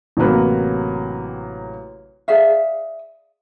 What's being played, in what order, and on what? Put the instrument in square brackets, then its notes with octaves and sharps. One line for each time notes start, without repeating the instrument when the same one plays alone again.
[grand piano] A1 C3 F#3 A#3 B4
[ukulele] G#4 D5 E5 F5